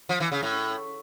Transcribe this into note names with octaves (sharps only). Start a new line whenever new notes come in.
F3
E3
C#3
A2